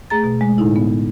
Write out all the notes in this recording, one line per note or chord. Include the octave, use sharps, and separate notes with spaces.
A3 G#4 A#5 A6
B2
G#3
A2 D3 D#4 E4
B3